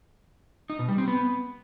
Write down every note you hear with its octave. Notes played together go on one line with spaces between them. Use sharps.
D#4
B2
G3
C4
B3